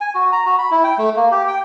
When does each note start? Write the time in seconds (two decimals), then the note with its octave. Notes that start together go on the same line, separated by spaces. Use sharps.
0.01 G#5
0.15 F#4
0.32 A#5
0.46 F#4
0.58 B5
0.71 E4
0.84 G5
0.98 A3
1.16 A#3
1.31 G4
1.48 G5